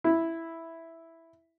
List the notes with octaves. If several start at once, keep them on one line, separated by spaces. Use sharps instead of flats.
E4